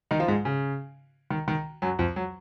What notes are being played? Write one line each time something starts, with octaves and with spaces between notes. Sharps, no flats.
D#3 D#4
F3 F4
G#2 G#3
C#3
D#3
D#3
F#2 F#3
F2 F3
F#3